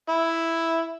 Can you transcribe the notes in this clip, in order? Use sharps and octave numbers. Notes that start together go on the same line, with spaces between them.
E4